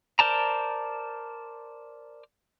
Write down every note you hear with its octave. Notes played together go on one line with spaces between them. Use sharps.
A#4 C5 D5 A5 A#5